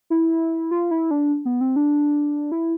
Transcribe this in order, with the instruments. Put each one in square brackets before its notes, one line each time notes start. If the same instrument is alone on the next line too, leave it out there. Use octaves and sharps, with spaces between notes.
[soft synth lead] E4
F4
E4
D4
B3
C4
D4
E4